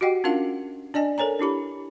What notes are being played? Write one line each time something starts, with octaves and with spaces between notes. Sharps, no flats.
F#4 G4 D#5 F#5 G5
C#4 D4 F4 A#4 F5 F#5
D4 D5 D#5 G#5
A4 A#4 C#5 G#5 A#5
D4 E4 G4 B5